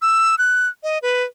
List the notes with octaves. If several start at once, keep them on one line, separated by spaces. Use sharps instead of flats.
E6
F#6
D#5
B4